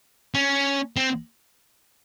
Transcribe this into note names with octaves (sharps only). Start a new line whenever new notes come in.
C#4
C4